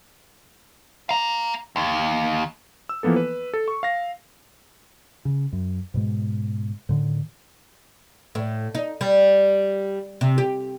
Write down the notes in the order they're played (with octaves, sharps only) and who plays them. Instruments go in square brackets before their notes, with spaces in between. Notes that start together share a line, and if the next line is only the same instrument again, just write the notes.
[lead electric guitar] F5 A#5
D#2
[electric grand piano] E6
E3 F3 A#3 B3 A4
B4
A4
C#6
F5 A#6
[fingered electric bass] C#3
F#2
G#2 B2 G#3
A2 D3 D#3
[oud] A2
D#4
G3
C3
G4